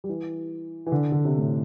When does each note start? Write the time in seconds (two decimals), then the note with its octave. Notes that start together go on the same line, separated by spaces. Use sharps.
0.04 G3
0.09 E3
0.86 E3
0.92 D3
1.12 D3
1.25 C3
1.38 A2